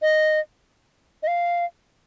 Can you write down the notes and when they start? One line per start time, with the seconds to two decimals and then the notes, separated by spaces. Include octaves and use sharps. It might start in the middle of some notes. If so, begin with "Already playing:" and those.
0.02 D#5
1.23 D#5
1.27 F5